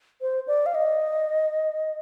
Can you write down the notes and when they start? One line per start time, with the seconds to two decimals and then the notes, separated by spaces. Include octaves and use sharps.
0.21 C5
0.47 D5
0.66 F5
0.75 D#5